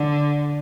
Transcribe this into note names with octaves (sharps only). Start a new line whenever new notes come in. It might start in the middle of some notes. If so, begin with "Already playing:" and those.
Already playing: D3